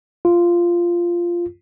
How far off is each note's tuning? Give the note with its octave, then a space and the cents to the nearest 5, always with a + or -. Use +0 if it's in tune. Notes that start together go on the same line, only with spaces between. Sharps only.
F4 -10